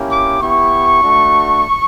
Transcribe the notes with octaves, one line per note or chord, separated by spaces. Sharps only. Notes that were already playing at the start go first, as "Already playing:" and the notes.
Already playing: A#3 C#4 E4 G4
D6
B3 E4 G4 C#6
A3 D4 F#4